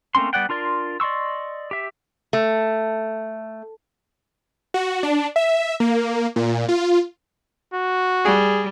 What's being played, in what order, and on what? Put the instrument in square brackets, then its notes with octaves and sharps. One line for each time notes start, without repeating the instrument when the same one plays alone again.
[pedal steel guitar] A3 A#3 C4 C#4 C6
G3 B3 D5 F#5 G5
D4 F4 A#4 D5 C6
D5 D#5 C6 C#6 E6
G4 E5
[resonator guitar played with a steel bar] A3
[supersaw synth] F#4
D4
E5
A#3
A#2
F4
[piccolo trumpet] F#4
[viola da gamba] G3 [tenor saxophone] G#4